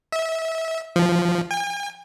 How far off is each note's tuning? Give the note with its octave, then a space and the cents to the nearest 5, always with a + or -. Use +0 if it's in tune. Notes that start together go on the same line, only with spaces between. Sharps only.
E5 -25
F3 -5
G#5 -45